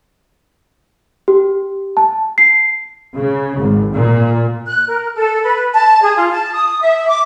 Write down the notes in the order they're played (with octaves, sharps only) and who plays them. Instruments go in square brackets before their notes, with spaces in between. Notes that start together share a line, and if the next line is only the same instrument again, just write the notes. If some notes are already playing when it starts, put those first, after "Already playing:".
[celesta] G4
A5
C7
[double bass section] C#3
G#1
A#2
[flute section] F#6
A#4
A4
B4
A5
G#4
F4
A5
D#6
E5
D6